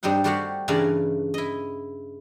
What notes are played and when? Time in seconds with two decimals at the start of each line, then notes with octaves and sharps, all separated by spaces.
0.03 G2 G3 C4 D#4 F#5
0.24 G3 A3 F#4 G4 F5 F#5
0.68 G2 C#3 E3 A3 A#4 D5
1.34 E4 D#5